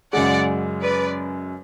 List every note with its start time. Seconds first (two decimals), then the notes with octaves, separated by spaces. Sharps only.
0.13 F#2 C#3 G#3 D5 F#5
0.82 B4 D5